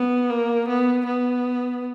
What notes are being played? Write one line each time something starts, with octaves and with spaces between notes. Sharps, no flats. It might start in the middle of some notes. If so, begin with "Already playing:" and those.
Already playing: B3
A#3
B3
B3